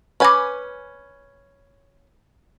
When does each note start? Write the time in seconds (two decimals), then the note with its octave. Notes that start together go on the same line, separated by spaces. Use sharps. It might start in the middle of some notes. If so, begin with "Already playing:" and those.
0.20 C#4 B4 G#5 B5 D6